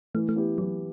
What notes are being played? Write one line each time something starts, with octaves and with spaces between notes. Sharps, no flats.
E3 A3
A3
B3 E4 G4
E3 F#3